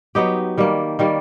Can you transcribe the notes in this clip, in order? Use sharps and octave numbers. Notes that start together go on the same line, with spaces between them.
F#3 B3 D#4 G4
D#3 G3 A#3
D#3 G3 A#3